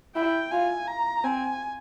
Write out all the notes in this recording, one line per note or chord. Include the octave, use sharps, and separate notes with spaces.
E4 G5
F4 G#5
A#5
C4 G#5